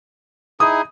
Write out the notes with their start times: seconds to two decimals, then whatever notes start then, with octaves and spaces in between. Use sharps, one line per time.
0.60 D#4 E4 G#4 D#6